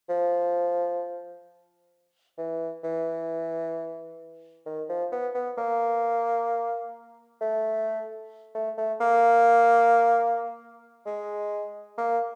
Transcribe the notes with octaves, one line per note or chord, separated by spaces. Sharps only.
F3
E3
E3
D#3
F3
B3
B3
A#3
A3
A3
A3
A#3
G#3
A#3